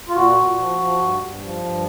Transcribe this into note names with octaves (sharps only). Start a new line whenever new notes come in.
F4
A#2 F#4
A#2
F3
F3
G2
G2
F3
G2